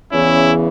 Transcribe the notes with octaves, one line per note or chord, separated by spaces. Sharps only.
E2 C#3 E3 C#4 E4